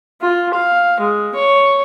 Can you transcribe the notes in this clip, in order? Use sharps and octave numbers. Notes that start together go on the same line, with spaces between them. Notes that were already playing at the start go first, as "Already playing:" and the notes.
F4
F5
G#3
C#5